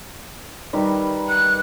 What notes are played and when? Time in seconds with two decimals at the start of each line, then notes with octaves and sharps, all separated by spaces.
0.73 D#3 G3 B4
1.29 F#6